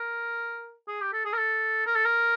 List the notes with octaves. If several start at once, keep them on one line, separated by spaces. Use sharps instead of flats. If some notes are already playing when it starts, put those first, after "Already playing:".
Already playing: A#4
G#4
G4
A4
G#4
A#4
A4
A#4
A4
A#4